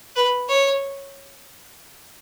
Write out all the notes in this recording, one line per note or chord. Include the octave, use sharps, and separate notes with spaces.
B4
C#5